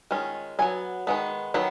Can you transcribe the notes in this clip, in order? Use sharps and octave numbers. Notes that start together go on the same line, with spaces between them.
D#3 G#3 C#4 F4
F#3 B3 F4 G#5
D#3 G#3 B3
D#3 F#3 B3